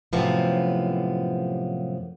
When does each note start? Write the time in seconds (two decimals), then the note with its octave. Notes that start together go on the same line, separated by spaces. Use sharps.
0.13 F#2 A2 C3 F3 B3